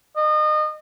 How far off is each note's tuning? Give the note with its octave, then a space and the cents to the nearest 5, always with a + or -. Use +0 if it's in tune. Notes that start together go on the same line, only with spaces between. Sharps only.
D#5 -30